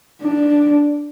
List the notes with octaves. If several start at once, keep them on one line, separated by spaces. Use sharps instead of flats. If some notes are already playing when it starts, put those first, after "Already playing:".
D4